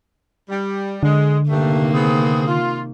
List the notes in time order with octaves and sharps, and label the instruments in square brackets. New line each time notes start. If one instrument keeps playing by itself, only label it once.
[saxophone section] G3
[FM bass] D3 [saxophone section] G#3
[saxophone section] G2 A3 [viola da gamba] C3 D#3 A#3
[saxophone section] B3 C4 G#4
F4